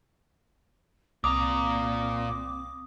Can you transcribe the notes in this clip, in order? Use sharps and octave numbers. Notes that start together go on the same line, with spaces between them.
C2 A#2 C4 A#5 D6 D#6